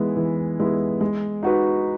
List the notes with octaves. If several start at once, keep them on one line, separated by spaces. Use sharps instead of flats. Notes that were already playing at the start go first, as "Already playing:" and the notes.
Already playing: E3 G#3 B3 E4
E3
G#3 B3 E4
G#3
D#4 F#4 B4